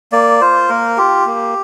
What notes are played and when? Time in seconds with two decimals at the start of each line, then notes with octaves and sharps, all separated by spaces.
0.12 A#3 D5
0.41 F4 C5
0.69 A#3 A#4
0.97 F4 G4
1.26 A#3